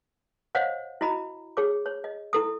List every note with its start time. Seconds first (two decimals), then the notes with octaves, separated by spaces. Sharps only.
0.55 C5 C#5 D#5 F5 F#5
1.01 E4 F#4 D#5 A#5 B5
1.57 G#4 C#5 D6
1.86 C#5
2.04 D#5
2.33 E4 A4 D#6